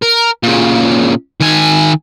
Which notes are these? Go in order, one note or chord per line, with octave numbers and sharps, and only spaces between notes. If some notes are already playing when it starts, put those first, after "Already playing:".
A#4
A#2 C#3
D#3 G#5